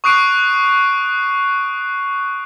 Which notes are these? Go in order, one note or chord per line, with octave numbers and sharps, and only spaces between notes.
C#6 D#6 F#6 C7 D7